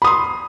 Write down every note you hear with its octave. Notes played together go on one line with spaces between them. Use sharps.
B5 C6 D#6